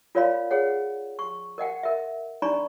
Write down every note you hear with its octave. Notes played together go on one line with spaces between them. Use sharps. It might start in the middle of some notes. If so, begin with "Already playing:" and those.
F4 A#4 C#5 D5 F5 B5
G#4 C#5 F#5
C#6
A#4 D#5 F#5 G5
A#4 E5
D4 D#4 D5 A#5 B5 C#6